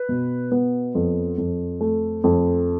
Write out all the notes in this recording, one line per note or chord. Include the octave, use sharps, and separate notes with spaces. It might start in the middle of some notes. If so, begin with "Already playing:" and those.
Already playing: B4
B2
B3
F2
F2
A3
F2